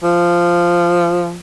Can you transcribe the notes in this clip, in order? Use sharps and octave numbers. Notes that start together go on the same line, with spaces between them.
F3